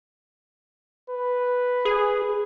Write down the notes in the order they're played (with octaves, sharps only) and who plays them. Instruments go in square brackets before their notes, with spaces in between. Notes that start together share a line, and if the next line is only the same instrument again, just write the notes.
[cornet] B4
[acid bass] G#4